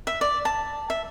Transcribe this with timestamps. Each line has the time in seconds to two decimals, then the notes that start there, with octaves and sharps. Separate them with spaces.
0.07 E5
0.21 D5
0.45 A5
0.90 E5